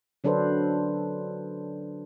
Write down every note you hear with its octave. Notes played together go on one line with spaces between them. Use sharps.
D3 F#3 D4 A4 B4 C5